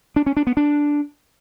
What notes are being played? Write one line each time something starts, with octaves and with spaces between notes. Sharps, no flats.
D4
C#4
D4
B3
D4